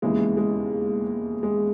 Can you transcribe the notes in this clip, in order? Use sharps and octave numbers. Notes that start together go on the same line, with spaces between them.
E1 D#2 C#3 E3 G#3
G#3
G#3